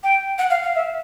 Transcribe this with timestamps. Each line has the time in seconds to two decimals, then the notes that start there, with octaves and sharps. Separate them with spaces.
0.03 G5
0.38 F#5
0.50 F5
0.63 F5
0.75 E5